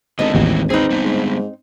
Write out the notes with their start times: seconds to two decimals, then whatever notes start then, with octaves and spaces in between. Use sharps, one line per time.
0.19 G#1 D3 B3 A4 D#5
0.35 A1 D#2 D#3 E3 F#3
0.70 C4 D#4 G#4 B4
0.90 G3 B3
1.04 G#2